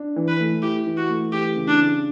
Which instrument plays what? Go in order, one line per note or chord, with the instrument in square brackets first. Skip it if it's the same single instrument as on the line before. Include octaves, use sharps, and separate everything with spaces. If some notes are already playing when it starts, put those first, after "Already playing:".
Already playing: [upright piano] D4
E3
[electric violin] B4
[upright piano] A3
[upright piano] E4 [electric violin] G4
[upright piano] E3
[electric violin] F#4
[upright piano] A3
[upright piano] E3 [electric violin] G4
[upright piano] C#3
[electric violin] D4
[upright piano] C#3